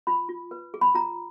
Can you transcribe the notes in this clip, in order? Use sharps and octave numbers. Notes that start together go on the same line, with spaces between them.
F4 B5
F4
B4
G#4
B5
F4 A#5